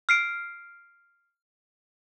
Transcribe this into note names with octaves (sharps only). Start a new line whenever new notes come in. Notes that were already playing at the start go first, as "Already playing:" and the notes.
F6 C7 D7